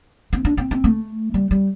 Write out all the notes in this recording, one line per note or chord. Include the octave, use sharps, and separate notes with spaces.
C4
D4
C4
C4
A3
G3
G3